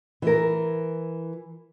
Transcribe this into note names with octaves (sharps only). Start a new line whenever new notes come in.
E3 A#4